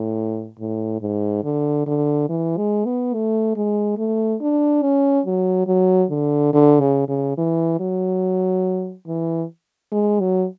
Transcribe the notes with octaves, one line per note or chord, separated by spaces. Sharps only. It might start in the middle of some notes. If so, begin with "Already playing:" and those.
Already playing: A2
A2
G#2
D3
D3
E3
G#3
B3
A3
G#3
A3
D4
C#4
F#3
F#3
D3
D3
C#3
C#3
E3
F#3
E3
G#3
F#3